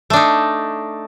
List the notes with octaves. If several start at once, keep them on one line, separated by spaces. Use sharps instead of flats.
A3 D4 D#4